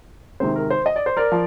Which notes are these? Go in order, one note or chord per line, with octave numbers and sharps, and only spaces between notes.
C3 D#3 G#3 C4 C5
A#4
C5
D#5
D5
C5
A#4 D5
F3